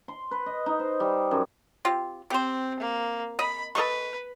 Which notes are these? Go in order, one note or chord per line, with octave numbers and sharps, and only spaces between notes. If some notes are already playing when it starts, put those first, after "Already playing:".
C6
B4
D#5
D#4
C5
G3
F#2
C4 F4 G4
C4 G4 C5
A#3
D#5 B5
A4 B4 D#5 C#6